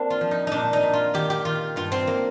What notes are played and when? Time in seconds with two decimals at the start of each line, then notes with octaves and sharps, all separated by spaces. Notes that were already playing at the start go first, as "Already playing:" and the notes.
Already playing: A#3 C4 D4
0.10 F4
0.21 F3
0.31 D#4
0.47 A#2 D4 D#4
0.73 D#4
0.83 A#2
0.93 F4
1.14 D#3 G4
1.30 G4
1.45 D#3 F4
1.76 G2 F4
1.92 C4
2.07 A#3